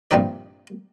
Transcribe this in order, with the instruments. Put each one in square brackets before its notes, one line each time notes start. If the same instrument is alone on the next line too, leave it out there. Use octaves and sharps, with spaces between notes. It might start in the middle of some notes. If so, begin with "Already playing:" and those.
[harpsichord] A#1 G2 C3 D#3 D#4 D5